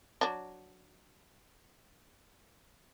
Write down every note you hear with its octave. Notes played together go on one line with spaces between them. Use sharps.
F#3 D4